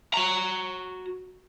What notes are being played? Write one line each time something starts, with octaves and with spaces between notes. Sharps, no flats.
F#4 A#5